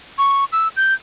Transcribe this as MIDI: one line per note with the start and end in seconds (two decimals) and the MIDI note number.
0.18 0.45 85
0.52 0.68 88
0.77 0.94 91